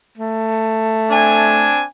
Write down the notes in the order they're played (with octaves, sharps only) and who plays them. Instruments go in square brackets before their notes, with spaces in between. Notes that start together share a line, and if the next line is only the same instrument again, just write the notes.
[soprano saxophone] A3
[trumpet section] C4 D4 G#5